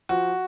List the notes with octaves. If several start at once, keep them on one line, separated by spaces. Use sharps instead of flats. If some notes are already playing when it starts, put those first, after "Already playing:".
F3 F#4